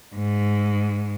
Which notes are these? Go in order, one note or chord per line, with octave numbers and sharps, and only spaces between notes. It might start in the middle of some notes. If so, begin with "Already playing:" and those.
G#2